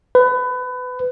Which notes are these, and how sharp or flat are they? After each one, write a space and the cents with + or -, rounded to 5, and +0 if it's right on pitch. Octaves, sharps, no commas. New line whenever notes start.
B4 +25